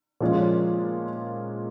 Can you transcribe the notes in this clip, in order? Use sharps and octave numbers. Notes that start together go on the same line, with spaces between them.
A#2 F3 G#3 C#4 F4